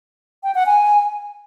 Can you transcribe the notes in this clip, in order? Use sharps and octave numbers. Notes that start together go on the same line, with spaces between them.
G5
F#5
G#5